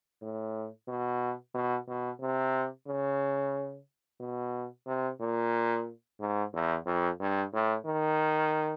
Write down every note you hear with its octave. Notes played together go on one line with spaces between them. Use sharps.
A2
B2
B2
B2
C3
C#3
B2
C3
A#2
G#2
E2
F2
G2
A2
D#3